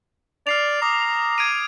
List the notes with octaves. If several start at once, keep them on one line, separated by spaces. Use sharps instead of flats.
D5 F6 C7 F7
A#5 D6 D#6
G#6 D7 D#7